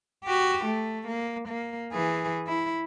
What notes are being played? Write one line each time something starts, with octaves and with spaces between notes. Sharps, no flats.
F#4 G4
A3
A#3
A#3
E3 G#4
E4